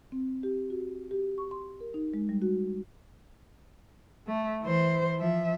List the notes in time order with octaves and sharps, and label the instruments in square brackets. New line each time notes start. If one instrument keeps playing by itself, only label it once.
[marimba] C4
G4
F#4
G4
C#6
C6
A#4
D#4
G#3
G3
F#4
[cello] A3
E3 C5
F3 E5